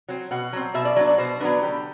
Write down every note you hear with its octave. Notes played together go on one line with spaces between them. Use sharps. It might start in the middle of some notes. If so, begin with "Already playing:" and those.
F#3 C4
B2 F#5
F#3 C4
B2 E5
D5
F#3 B3 D4 D5
D5
B2 C5
F#3 B3 D4 B4
D3 G4